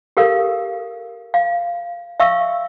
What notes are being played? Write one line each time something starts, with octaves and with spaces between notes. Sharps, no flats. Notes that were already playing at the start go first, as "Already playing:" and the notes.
G4 A4 A#4 F5
F5
E5 F5 C#6 E6